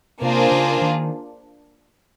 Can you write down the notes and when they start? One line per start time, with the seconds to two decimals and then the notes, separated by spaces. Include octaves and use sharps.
0.21 C3 A#3 D4 F4 G#4 C5
0.51 C#3
0.81 D#3